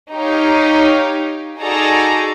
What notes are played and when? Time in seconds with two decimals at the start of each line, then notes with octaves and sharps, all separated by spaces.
0.13 D#4 G4 C#5 F5
1.59 D#4 F#4 G#4 A4 D5 A#5